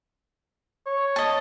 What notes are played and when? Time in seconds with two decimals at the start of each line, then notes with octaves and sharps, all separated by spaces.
0.86 C#5
1.16 D#5 A5